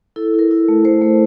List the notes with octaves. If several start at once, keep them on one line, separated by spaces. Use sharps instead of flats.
E4 A4
E4 A#4
E4
A3
A3 C5
A3